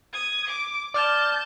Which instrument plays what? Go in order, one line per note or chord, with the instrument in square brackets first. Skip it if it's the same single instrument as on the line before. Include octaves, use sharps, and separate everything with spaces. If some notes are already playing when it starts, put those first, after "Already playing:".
[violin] D#6 G#6
D6
[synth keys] D5 F6 [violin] A5 G6